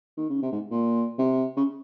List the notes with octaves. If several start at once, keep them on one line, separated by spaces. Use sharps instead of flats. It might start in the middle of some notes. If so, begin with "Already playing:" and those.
D#3
C#3
C3
G#2
A#2
C3
C#3